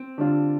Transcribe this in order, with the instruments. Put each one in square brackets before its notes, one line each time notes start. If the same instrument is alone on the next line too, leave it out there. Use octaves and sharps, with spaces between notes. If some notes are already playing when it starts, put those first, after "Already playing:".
Already playing: [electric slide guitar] C4
[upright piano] D3 G3 D4 F4